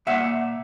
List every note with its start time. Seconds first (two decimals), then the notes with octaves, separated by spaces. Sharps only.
0.07 A#2 E5 F#5